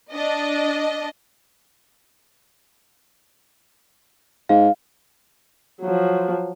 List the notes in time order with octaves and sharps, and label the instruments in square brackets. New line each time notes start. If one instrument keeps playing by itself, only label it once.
[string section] D4 D#5
[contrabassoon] G#2 [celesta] F5
[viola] F3 F#3